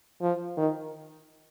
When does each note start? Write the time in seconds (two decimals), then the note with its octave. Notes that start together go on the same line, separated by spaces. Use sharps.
0.22 F3
0.57 D#3